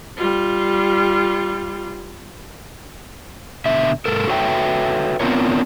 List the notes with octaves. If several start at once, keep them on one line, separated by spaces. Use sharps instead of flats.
G3 F4
B2 D3 E5
G#2 A4 A#4
F#4 A4 B4 C#5 E5 G5
B3 C4 D4 F4 A#4 C#5